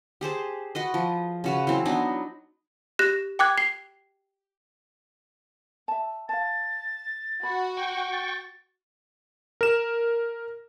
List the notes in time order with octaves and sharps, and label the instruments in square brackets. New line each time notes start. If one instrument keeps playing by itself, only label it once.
[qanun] G4 G#4 C5 A5
F#4 B4 D#5
F3
C#3 F#4 B4
E3 F#3 C4
F#3 B3 D4 D#4
[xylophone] G4 F#6 A#6 E7
G5 D6 F#6 G#6
C7
[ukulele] E5 A5
[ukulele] F5 A5 [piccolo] A6
[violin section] F#4 [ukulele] B5
[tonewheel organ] G5 C#6
[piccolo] A6
[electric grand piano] A#4 E7